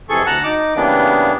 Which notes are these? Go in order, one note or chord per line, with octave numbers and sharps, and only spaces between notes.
F2 C3 E3 G#4 A4 C#6
D2 F#5 A5 A#5 F#6
D#4 D6
C#3 E3 G3 A#3 B3 D4